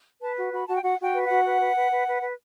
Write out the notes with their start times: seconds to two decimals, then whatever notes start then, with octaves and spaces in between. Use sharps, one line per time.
0.22 B4 A5
0.37 F#4
0.53 F#4 B5
0.68 F#4 A5
0.76 G5
0.83 F#4 F#5
0.99 F#4 G5
1.14 B4
1.25 F#4 F#5
1.45 B4
1.60 B4
1.75 B4
1.91 B4
2.07 B4
2.22 B4